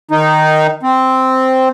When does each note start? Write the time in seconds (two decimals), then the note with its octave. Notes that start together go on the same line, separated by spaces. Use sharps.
0.11 D#3 D#4
0.83 C4